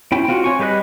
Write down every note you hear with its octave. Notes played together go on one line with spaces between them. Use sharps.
C#4 E4 G5
C4 F4 F#4
C#5 G#5 C#6
G3 G4 B4 D#5 F#6